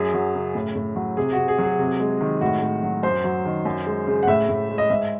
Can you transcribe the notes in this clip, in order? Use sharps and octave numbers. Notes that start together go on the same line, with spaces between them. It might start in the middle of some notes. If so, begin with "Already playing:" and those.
Already playing: F#2 G#4
F#3
C#3
A2
A2
F#3
C3 G#4
F#4
C3
G#4
F#3
G#4
C3
G#3
D#3
A2 F#4
A2
F#3
F#2 C5
F#3
D#3
F#2
G#3
C#3
F#5
A2 E5
A2
G#3
D#5
G#2 E5